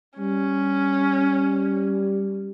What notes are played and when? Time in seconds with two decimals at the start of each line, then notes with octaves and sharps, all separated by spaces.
0.19 G3 C#4